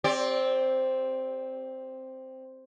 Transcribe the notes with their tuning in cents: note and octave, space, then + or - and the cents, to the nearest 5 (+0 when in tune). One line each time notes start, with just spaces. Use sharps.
C4 +0 G4 +20 D5 -20